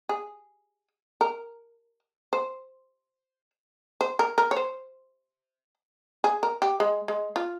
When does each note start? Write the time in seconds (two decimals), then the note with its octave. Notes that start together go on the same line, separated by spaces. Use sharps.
0.09 G#4
1.21 A#4
2.33 C5
4.01 C5
4.19 A#4
4.38 A#4
4.51 C#5
4.56 C5
6.24 G#4
6.43 A#4
6.62 G4
6.80 G#3
7.08 G#3
7.36 F4